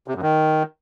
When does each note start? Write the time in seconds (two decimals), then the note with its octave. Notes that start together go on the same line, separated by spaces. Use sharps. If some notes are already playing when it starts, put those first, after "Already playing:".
0.08 C3
0.15 F#2
0.22 D#3